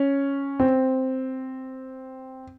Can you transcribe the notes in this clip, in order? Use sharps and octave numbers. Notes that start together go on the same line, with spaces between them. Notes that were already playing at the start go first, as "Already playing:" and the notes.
Already playing: C#4
C4